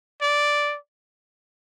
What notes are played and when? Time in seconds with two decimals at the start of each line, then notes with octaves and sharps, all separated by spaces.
0.22 D5